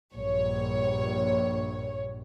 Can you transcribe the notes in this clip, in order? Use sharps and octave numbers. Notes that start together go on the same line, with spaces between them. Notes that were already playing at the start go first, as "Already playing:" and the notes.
A#1 G2 C#5